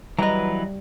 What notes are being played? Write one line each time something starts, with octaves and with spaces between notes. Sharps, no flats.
E3 F#3 G3 B4 D#5 A#5